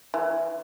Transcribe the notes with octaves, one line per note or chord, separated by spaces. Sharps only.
E3